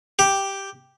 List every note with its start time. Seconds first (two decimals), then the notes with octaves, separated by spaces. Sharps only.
0.19 G4